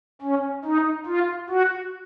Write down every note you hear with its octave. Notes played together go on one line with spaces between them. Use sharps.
C#4
D#4
F4
F#4